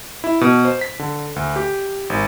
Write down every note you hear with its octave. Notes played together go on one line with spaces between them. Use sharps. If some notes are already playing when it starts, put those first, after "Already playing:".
E4
B2
C5
B6
D3
D2
G4
G#1